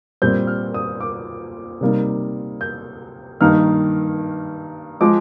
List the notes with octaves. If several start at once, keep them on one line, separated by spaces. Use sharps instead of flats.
A#2 G3 C4 G6
F6
D#6
D6
C3 G3 A#3 D#4
G6
G2 D#3 A#3 D#4 F6
F3 G#3 D6